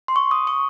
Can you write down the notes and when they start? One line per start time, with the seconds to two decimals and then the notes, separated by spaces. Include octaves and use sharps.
0.08 C6
0.16 C#6
0.31 D#6
0.47 C#6